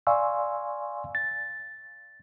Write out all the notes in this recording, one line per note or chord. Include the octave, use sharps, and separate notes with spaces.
D5 F5 G#5 C6 C#6 E6
A6